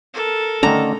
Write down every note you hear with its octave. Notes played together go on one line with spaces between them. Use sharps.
A4 A#4
D3 D#3 A3 C#4 A#5